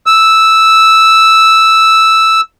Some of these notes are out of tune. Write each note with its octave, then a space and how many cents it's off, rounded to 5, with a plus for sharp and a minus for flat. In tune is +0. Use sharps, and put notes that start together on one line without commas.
E6 -5